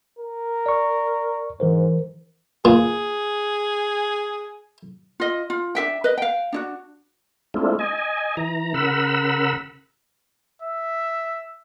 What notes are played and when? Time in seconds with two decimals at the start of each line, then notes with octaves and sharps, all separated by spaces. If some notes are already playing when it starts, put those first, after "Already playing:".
0.19 A#4
0.66 D5 C#6
1.60 G#2 E3 A#4 C5
2.65 A#2 G#4
5.20 F4 D#5
5.50 F4
5.75 D4 G#4 E5 G5
6.04 B4 D#5
6.18 F5 G5
6.53 D4 E4 F#4
7.54 G#3 A3 C4 D4 E4 F4
7.79 D#5 G#5
8.37 E3 A#5
8.74 C#3 A#4 F#5 B5 E6
10.62 E5